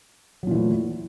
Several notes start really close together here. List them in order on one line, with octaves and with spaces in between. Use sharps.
F#3 A#2 E3 A3